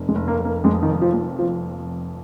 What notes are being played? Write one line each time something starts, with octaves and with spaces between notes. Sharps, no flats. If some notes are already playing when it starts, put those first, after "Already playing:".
Already playing: F1
G#3
F1
A#3
F1
A#3
F2 G#3
D#3
F1
F3
F2
F3